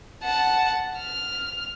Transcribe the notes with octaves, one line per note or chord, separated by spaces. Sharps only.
F#5 A5
F6